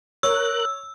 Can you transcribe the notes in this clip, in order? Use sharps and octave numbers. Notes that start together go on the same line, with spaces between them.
A#4 C#5 E6 F#6